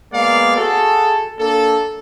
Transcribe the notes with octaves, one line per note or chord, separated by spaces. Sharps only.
G#3 A#3 B3 D5 F5
F#4 G#4 A4
A#3 D4 A4